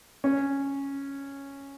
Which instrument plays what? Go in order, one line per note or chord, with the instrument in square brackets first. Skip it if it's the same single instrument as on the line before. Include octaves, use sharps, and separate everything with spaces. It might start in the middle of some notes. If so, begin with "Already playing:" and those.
[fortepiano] C#4